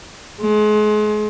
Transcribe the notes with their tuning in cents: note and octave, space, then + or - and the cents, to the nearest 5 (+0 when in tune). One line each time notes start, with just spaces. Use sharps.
G#3 +35